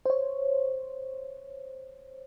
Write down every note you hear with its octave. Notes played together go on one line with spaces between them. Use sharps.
C5 C#5